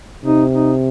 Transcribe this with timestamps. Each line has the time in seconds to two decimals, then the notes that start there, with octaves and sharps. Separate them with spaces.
0.24 C3 D#4
0.53 D#4